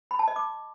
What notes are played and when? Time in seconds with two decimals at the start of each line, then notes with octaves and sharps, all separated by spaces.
0.11 B5
0.19 A5
0.28 D#5
0.36 D6